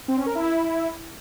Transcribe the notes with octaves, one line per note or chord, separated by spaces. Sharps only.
C4
C#4
A#4
E4